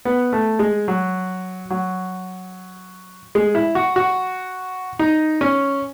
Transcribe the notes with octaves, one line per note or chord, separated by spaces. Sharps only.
B3
A3
G#3
F#3
F#3
G#3
E4
F#4
F#4
D#4
C#4